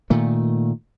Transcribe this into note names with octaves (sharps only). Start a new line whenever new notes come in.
A#2 D#3 A3